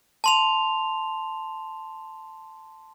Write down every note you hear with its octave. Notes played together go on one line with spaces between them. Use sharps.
A5 C6 F7